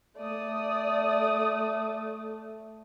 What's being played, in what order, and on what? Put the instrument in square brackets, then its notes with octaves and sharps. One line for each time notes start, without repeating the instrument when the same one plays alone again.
[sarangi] A3 [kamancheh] D5 D#6